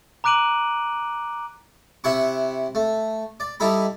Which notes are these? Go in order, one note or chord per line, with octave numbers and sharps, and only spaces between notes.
A#5 D6 F#6 D7 D#7 F#7
C3 E4 F#5 C#6
A3
D5
G3 D#4 E4 A4 B5